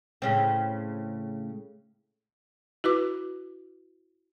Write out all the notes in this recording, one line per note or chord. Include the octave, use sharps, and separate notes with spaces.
A2 C#3 C4
E4 F#4 B4 D6